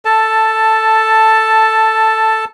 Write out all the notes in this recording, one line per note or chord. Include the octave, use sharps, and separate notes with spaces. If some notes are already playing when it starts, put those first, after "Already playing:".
A4 A5